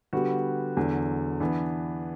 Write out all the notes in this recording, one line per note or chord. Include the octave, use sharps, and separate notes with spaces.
D3 G3 B3 F#4
E2 D3 F#3
E3 B3 D4